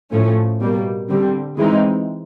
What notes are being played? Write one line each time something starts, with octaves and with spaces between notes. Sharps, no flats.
A2 F3 A3 C#4
B2 G3 A#3
D3 G3 C4
E3 G#3 C4 D#4